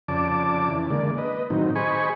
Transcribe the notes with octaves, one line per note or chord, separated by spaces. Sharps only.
F2 C#3 D5 A5 D6
C#3 E3
D3 G#3 A#3 D5
B4 D#5
A2 D#3 F#3 C4 D#4
G#4 C5 D#5 G#5 B5 C#6